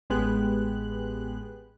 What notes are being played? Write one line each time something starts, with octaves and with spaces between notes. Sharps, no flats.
A1 G#3 B3 G4 F#6